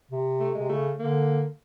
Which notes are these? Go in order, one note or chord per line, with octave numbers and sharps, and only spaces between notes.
C3
A3
C3 G#3
C#3 A3
D3 A#3